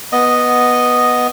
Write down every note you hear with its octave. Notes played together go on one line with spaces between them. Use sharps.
B3 D#5